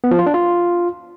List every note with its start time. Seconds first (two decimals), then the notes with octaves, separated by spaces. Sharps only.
0.04 B3
0.11 F3
0.19 F4
0.26 D4
0.34 F4